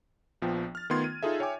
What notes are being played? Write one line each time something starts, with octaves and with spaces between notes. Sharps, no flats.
A#1 F3 B3 G5
F6 A6
D#3 A3 B3 F4 C6 G#6
D#7
D#4 F4 G#4 A4 E5
C#5 E5 G5 G#5 D6